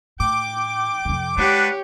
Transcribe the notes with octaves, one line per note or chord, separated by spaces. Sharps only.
A2 G5 D6
F2 C3
G#3 D4 G4 B4 C#5 F#5